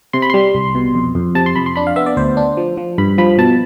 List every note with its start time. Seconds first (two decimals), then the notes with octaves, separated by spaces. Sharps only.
0.13 C3 C6
0.22 B5
0.30 G3 C6
0.55 C2
0.75 B2
0.95 F2
1.15 F2
1.35 C3 A5
1.46 C6
1.56 F2 B5
1.66 C6
1.76 D4 B5
1.87 F5
1.96 B3 E5
2.06 D5
2.17 D2 C5
2.37 D4
2.57 F3
2.77 F3
2.98 G2 B5
3.18 F3 B5
3.38 B2 A5